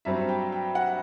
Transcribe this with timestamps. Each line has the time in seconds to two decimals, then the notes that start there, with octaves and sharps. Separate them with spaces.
0.05 G2 F#3 C4 E5
0.29 G5
0.52 G5
0.75 F#5